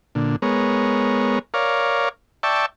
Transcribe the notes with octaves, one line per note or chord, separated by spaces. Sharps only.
A#2 D3
G#3 B3 A#4 C#5
A#4 C#5 D5 F5
D5 E5 G5 A5 C#6